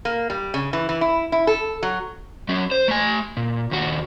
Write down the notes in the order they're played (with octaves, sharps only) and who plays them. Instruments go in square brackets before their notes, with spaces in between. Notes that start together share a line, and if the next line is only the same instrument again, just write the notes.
[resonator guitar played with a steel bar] A#3
G3
C#3
E3
E3
E4
E4
A4
F#3
[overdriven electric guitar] F#3 C#4
C5
A3 G#5
A#2
D#2 F#4